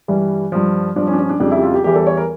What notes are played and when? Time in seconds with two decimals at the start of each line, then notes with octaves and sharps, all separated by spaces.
0.08 G2 E3 G3
0.52 G2 F3
0.96 G2 F3 D4
1.07 C#4
1.13 D4
1.18 C#4
1.29 D4
1.40 F2 C#3 G3 D4
1.51 E4
1.58 G4
1.63 F4
1.74 G4
1.84 E2 E3 G3 G4
1.96 A4
2.07 C#5
2.17 A#4